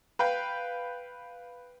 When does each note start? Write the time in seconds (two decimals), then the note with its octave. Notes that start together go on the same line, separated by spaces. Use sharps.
0.19 B4 F5 G5